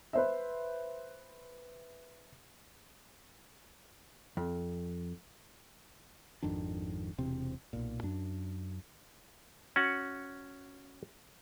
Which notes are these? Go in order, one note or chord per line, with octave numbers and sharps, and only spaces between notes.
B4 C5 E5
F2
G#1 F2 D#3 D4
E1 C3 C4
B1 A#2
F#2 D4
C#4 F#4 F#5